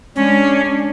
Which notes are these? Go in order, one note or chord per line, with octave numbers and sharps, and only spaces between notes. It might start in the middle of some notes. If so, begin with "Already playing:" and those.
G#3 C#4 D4